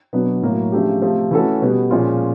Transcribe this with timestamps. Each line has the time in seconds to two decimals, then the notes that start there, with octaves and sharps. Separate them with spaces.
0.13 B2 F#3 B3 D4 F#4
0.42 A2 F#3 A#3
0.72 C#3 F3 A3 D4 G4
1.02 C3 F3 A3
1.31 E3 A3 C#4 F#4 A4
1.62 B2 G3 B3
1.90 A#2 F3 G#3 C#4 F4